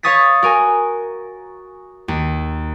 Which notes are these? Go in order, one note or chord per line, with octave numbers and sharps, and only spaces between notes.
C#5 F5 C#6 D#6 A6 B6
F#4 A#4 G#5
D#2